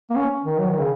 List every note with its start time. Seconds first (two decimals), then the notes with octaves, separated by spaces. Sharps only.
0.10 A#3
0.16 C#4
0.45 D#3
0.59 F#3
0.69 D#3
0.80 C#3